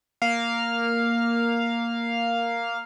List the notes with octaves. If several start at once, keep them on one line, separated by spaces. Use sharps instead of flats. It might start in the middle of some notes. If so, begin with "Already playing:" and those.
A#3 F5